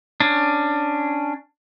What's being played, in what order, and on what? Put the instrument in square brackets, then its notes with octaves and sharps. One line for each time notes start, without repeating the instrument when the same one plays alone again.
[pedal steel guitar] C#4 D4